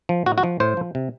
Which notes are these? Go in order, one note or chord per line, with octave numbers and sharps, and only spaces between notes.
F3
A2 F#4
F#4
F3
A2 C5
F3
C3